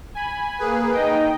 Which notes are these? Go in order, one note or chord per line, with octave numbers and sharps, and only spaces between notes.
G#5 B5
A#3 G#4 B4
D#4 D#5 G5